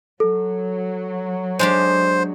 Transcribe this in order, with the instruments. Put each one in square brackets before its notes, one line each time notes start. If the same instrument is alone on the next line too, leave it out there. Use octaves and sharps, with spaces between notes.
[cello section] F#3 [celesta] A4
[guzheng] G#3 D4 G4 [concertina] C5